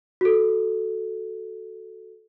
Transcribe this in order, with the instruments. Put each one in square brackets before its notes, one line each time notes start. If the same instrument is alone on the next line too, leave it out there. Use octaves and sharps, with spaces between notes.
[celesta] F#4 A4